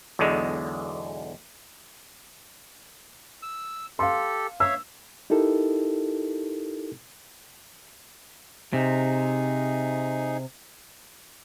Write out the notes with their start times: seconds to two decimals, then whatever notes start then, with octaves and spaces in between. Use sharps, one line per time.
0.19 B1 E2 B2 D3 G#3
3.42 E6
3.99 G4 A4 F5 C6
4.60 C#5 E5 F5 E6
5.30 D#4 E4 G4 A4 A#4
8.73 C3 D#4 G#4